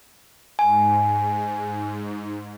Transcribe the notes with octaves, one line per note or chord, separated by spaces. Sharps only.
G#2 G#5